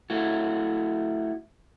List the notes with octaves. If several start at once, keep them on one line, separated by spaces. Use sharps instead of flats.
A3 E4 F#4